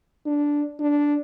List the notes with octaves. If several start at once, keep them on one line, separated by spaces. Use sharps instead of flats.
D4
D4